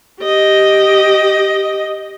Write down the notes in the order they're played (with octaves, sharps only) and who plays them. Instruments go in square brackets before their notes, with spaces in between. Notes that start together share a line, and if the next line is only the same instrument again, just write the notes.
[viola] G4 D#5